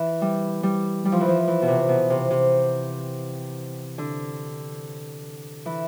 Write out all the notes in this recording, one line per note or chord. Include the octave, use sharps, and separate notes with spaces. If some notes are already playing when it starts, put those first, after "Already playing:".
Already playing: E3
G3
G3
G3
F3
E3
F3
E3
B2
C3
B2
C3
C3
D3
E3